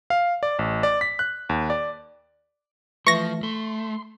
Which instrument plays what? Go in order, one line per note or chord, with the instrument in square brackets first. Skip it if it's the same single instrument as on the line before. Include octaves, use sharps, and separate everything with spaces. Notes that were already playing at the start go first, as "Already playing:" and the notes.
[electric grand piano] F5
D5
A1
D5
B6
F#6
D#2
D5
[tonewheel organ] E3 A3 [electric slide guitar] F3 [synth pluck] C#6 A#6
[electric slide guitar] A3 [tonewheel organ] C6